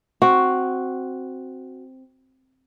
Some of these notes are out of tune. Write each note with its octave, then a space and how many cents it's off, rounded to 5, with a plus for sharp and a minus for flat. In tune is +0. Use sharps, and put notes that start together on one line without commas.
C4 +0 F#4 +0